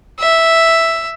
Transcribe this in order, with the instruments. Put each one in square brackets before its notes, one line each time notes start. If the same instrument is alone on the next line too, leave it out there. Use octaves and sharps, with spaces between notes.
[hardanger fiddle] E5